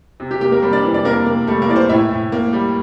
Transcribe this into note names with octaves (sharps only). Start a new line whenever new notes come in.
C3
G4
A#3 G4
A#3 A#4
G3 C4 C5
D4 D5
E3
D4 D5
C3 A#3 A#4
A#3
G3 A3 A4
A#3 A#4
E3 D5
C4 C5
A2 E4 E5
A2
A#3
G3